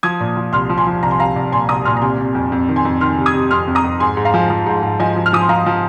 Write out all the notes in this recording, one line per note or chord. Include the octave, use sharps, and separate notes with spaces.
F3 D#6 G#6
A#2
F3
C2 C6 F6
F3
G#5 C6
F3
C2 A#5
C6
C2 F5 A#5
C2
A#2 G#5 C6
C2 A#5 D#6
A#2 C6 F6
A#5
C3 G#5 C6
C3
F2
F2
D#3
G#5 C6
F2
D#3 C6 F6
C3
D#6 G#6
C3
F2 C6 F6
F2
A#5 D#6
F2
G#2 G#5 C6
G#2
F5 A#5
F3
F3
G#2
G#2
F3 D#5 G#5
F3
F6
F3 D#6
C6
F3 F5 A#5
F3